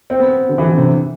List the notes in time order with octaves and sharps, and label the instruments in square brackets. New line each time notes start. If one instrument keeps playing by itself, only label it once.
[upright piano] C4
B3
D3
E3
D3
C3